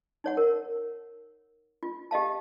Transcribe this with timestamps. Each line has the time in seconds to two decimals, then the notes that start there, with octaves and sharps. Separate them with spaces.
0.24 D#4 C#5 F#5
0.37 A#4
1.83 F4
2.11 G4 D#5 F5 A5